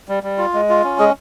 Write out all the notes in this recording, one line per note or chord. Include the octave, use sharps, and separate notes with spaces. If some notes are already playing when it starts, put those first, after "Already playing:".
G3
G3
F4
G#3
F4
C#4
G#3 G#4